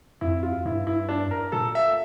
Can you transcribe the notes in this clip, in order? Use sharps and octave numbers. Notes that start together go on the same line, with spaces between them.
F2 E4
F4
G2 E4
E4
D4
A#4
A#2 A4
E5